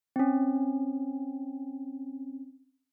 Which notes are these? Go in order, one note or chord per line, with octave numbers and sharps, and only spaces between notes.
C4 C#4